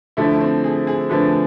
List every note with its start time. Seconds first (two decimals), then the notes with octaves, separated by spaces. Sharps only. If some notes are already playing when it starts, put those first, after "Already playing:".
0.17 D3 F3 A3 E4
0.40 C4
0.64 G#4
0.87 G#4
1.10 D3 F3 A3 B4